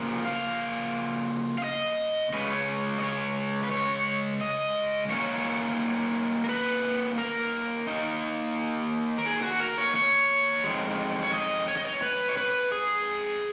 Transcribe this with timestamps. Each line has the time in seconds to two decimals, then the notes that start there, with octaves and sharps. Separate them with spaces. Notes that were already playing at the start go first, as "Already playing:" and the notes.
Already playing: C#3 F3 A#3
0.25 F5
1.58 F5
1.64 D#5
2.33 C#3 G#3 C#4 B4
2.50 C#5
2.98 D#5
3.02 C#5
3.64 B4
3.71 C#5
4.41 D#5
5.10 D#3 A#3 C#4 C#5
6.44 A#4
6.49 B4
7.18 A#4
7.87 D#3 A#3 D#4
9.18 A#4
9.26 G#4
9.43 F#4
9.60 A#4
9.78 C#5
9.96 C#5
10.64 F2 D#3 G#3
11.23 C#5
11.34 D#5
11.68 C#5
11.77 D#5
11.85 C#5
12.03 B4
12.29 C#5
12.37 B4
12.72 G#4